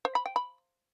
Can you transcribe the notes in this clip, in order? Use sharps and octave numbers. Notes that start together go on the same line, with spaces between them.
C5
B5
G5
B5